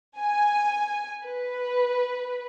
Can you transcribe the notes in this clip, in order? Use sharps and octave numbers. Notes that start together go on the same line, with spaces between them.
G#5
B4